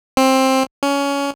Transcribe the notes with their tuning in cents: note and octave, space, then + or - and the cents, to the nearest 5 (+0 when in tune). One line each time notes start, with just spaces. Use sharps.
C4 +15
C#4 +20